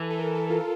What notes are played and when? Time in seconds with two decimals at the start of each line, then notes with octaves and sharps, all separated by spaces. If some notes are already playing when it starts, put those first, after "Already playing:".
Already playing: E3 A4
0.10 A4
0.19 A#4
0.35 A4
0.50 F4